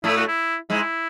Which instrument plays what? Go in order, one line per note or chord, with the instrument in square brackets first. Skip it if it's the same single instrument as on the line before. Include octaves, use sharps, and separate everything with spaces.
[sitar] A2 A3 [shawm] E4
[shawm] F#4
E4
[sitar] G#2 G#3 [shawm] E4